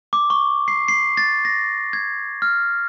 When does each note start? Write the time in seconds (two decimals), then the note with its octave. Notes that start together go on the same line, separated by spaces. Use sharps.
0.13 D6
0.30 C#6
0.68 C7
0.88 C7
1.17 A6
1.45 A#6
1.93 G#6
2.42 F6